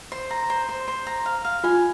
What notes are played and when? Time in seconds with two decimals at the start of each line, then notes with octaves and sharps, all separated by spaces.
0.12 C5
0.31 A#5
0.50 C5
0.69 C5
0.88 C5
1.07 A#5
1.26 F5
1.45 F5
1.64 F4 G#5